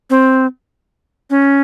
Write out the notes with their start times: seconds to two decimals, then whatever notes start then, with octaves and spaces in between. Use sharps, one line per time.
0.10 C4
1.30 C#4